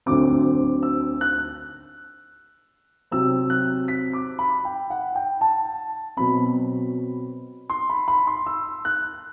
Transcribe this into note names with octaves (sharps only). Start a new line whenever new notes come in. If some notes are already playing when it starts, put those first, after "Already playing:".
D2 D3 F#3 C4 D6
E6
F#6
C3 F#3 C4 E6
F#6
B6
D6
B5
G5
F#5
G5
A5
B2 F#3 C4 B5
C6
B5
B5
C6
E6
F#6